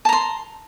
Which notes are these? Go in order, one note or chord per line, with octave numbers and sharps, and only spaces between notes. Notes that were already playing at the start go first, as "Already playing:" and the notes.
A5 A#5 C6